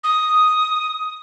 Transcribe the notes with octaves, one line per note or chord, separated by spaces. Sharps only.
D#6